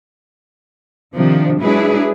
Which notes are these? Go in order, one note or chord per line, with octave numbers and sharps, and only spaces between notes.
C3 D#3 F3 D4
F#3 G#3 D4 E4 G#4 B4